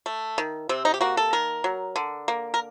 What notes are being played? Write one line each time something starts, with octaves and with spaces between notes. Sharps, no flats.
A3
D#3
C3 C4
D#4
G4
A#3 F#4
A4
D#3 A#4
F#3
D3
A#3
A#4